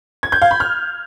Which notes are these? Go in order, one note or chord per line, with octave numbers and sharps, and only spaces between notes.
G#6
G6
F5
B5
F6